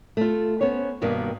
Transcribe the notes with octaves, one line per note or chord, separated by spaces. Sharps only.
A3 F4
B3 C#4 C5 C#5
G2 B2 D#3 A#3 D4